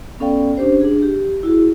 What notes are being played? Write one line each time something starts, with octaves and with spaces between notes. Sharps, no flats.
B3 C#4 A4 D5 F5 G5
C#4 D4 G4 C5
D4 G#4
G4
E4 F#4 G#4